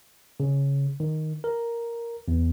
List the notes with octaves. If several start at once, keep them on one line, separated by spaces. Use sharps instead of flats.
C#3
D#3
A#4
E2